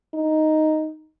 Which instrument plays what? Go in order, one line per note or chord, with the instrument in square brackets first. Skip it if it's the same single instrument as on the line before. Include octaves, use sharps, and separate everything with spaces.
[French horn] D#4